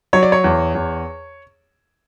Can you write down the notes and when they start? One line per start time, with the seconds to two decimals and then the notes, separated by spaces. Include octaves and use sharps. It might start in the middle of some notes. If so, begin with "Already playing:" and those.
0.13 F#3 C#5
0.23 D5
0.32 C#5
0.44 E2
0.75 E2